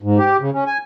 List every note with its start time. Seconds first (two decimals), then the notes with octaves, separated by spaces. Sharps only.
0.02 G#2
0.18 G4
0.41 C#3
0.54 C#4
0.66 G#5